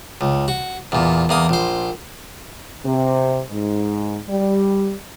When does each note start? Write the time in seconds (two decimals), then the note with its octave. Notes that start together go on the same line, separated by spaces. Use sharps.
0.21 C#2
0.48 F#4
0.92 E2 A#2
1.29 E2 A#3 D#6
1.49 A#1 C5
2.86 C3
3.51 G#2
4.29 G3